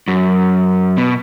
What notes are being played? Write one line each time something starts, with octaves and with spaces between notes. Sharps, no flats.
F#2
B2